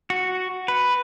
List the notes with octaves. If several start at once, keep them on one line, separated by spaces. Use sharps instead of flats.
F#4
B4